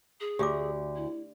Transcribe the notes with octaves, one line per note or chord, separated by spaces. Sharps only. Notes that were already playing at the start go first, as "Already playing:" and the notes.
G#4
D2 G4 E5 D6
E4